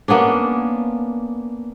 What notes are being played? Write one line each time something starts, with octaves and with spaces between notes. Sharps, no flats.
A#3 B3 C#4 D4